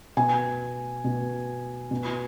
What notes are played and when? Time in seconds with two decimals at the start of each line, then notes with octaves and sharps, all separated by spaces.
0.17 B2 G#5
1.04 B2
1.91 B2